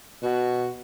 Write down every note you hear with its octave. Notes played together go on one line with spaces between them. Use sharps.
B2 F#4